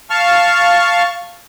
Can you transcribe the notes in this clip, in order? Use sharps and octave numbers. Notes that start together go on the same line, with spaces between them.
F5 A5 C#6 F6